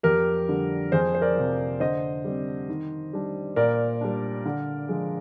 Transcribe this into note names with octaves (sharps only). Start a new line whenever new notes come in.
F2 G4 A#4
D3 G3
F2 G#4 C5
C5
A#4 D5
C3 F3
D3 C5 D#5
G3 C4
D#3
G3 D4
A#2 A#4 D5
G3 D4
D3
F3 G#3